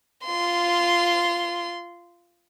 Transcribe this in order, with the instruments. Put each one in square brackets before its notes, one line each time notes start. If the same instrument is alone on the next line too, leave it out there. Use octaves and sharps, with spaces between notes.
[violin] F4 C6